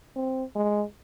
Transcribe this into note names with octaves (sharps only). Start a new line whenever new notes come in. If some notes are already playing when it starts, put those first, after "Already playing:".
C4
G#3